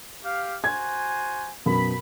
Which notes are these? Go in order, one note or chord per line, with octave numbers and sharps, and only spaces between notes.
G4 F5
F#4 C5 G#5 G#6
F#2 B2 B5